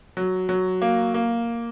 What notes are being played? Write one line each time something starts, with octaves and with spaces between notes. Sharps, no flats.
F#3
F#3
A#3
A#3